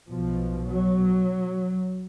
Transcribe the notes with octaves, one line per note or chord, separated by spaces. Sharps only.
B1 B2 F3
F#3